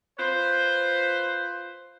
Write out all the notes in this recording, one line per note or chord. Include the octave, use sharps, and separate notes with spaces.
F4 B4 C5